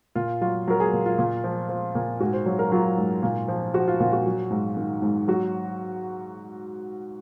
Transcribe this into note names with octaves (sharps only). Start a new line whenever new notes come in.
A#2 F4
F#3 F4
F#3 A#4
G#4
A#2
F4
A#2
F3
F3
A#2
G#2 F#4
C5
F#3 C#5
A#4
F#3 F4
G#2
A#2
F3
F3 F#4
F4
A#2 F4
F#4
F#3
G#2
D#3
G#2
F#3 F#4